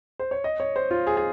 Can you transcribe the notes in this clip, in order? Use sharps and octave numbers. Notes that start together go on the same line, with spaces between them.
C5
C#5
D#5
C#5
C5
F4
G#4
G#4